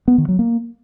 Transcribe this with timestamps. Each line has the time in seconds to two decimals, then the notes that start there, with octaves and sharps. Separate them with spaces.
0.08 B3
0.18 D#3
0.28 F#3
0.39 A#3